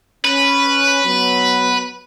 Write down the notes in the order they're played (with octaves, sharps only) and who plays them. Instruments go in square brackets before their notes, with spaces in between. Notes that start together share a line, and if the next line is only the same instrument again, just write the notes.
[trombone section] C#4 [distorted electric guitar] B4
[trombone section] F#3 B3